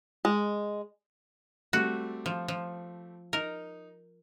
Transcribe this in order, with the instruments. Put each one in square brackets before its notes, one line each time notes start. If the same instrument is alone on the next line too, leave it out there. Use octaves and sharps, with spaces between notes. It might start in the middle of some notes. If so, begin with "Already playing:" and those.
[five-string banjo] G#3
[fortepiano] G3 A3 C4 [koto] F#4
[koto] F3
F3
[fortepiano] D#4 [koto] A#4